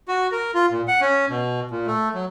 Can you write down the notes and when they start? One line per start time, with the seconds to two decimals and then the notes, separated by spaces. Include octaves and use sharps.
0.08 F#4
0.32 A#4
0.54 F4
0.71 A#2
0.88 F#5
1.01 C#4
1.30 B2
1.71 A#2
1.87 A3
2.14 F#3